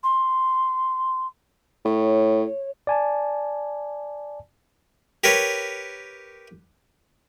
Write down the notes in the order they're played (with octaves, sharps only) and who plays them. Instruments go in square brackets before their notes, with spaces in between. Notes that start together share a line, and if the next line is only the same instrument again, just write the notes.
[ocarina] C6
[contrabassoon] A2 [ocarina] C#5
[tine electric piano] D5 G#5 A5
[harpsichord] G4 A#4 B4 C#5